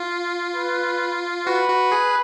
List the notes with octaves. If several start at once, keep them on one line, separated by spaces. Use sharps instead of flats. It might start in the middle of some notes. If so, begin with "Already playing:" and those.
Already playing: F4
B4
F#4 B4
F#4
G#4